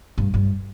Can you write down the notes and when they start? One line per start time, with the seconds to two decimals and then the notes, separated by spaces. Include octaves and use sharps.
0.18 G2
0.34 G2